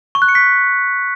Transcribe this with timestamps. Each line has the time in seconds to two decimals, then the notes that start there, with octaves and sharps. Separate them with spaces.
0.15 C#6
0.22 F#6
0.28 C#7
0.35 B6